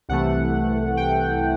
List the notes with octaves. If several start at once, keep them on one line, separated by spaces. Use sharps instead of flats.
C2 C3 E3 A3 F#5
G5